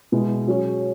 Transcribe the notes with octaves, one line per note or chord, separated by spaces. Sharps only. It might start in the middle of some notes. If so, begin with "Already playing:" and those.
B2 G#3 E4
F#3 C#4 G#4 C#5